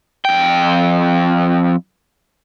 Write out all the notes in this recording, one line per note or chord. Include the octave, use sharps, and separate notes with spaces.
F2 G5